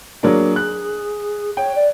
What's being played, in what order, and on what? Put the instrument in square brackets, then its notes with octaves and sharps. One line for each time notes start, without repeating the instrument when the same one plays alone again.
[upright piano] F#3 A#3 D4 [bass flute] G#4
[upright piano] F#6
[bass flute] C#5 [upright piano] G5
[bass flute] D5